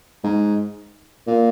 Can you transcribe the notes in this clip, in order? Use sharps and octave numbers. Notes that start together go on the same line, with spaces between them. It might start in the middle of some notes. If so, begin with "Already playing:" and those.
G#2
A#2